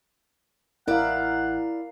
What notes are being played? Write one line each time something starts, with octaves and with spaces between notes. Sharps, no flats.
A1 E4 A#4 D5 F5 F#5